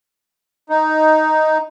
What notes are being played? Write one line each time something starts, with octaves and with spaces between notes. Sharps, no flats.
D#4